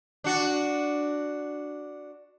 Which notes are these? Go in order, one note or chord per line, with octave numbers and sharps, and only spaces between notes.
D4 F#4